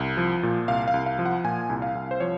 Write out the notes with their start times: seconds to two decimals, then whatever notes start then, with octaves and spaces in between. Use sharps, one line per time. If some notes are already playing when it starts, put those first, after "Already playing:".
Already playing: C2
0.17 F3
0.43 A#2
0.68 C2 F5
0.88 F5
0.94 C2
1.06 F5
1.19 F3
1.26 F#5
1.44 A#2 G#5
1.69 C2
1.82 F5
1.95 C2
2.11 C5
2.20 F3 C#5